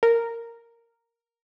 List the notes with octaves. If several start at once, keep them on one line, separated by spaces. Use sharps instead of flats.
A#4